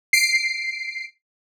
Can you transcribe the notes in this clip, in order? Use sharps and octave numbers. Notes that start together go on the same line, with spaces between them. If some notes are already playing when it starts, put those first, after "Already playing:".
C7 D7